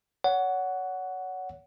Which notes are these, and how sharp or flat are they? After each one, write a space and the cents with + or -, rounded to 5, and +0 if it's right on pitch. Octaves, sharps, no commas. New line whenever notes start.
C#5 +30 F#5 +0